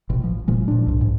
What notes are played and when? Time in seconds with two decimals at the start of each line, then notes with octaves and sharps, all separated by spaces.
0.10 A1 B2
0.24 F3
0.48 F#1 A#2 F3 G#3
0.68 A#2 D4
0.87 C2 G#2
1.01 G#2